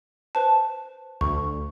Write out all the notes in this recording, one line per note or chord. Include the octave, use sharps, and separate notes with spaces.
B4 C5 A5
D2 C#6